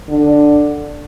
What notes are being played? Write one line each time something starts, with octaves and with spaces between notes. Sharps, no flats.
D3